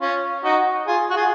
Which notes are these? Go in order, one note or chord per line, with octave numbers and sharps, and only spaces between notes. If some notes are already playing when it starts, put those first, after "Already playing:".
C#4 F4
D#4 F#4
F4 G#4
F#4
F4 G#4